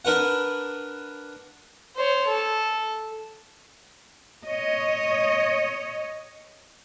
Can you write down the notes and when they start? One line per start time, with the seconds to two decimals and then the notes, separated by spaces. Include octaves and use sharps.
0.05 D4 A#4 B4 F#5
1.96 C5 C#5
2.27 A4
4.47 C#5 D#5